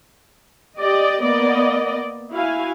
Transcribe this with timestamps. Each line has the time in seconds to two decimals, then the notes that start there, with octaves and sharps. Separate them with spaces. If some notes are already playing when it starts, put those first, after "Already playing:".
0.78 G4 D5 D#5
1.21 A#3 B3 D5 D#5
2.31 E4 F#4 F5 G#5